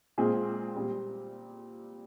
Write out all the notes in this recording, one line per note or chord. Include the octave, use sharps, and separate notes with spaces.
A#2 G#3 C4 F4 G#4
A#2 G3 C4